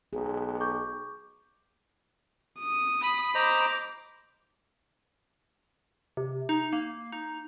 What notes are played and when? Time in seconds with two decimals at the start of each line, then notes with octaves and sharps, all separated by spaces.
0.13 B1 G#4
0.61 C#6 D6 G6
2.59 D#6
3.01 B5
3.35 C5 D#5 A#5 D6
6.17 C3
6.49 D#4
6.73 A#3
7.12 D#4